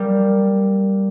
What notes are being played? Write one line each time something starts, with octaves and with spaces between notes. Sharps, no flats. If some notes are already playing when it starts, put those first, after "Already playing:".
Already playing: G3 A#3